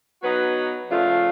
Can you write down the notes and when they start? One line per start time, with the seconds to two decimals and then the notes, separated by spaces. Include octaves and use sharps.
0.22 F#3 B3 D#4 F#4 B4
0.89 C#3 F3 A3 D4 F4